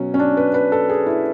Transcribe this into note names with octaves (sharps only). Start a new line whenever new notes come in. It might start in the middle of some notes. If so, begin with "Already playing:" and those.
Already playing: B2 F#3 C#4
C#4
D4
B4
B4
A4
G#4
E4